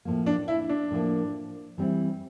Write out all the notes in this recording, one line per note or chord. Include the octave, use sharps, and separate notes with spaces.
A2 F3 A#3
D4
E4
D4
A2 F3 A#3
E3 G3 C4 E4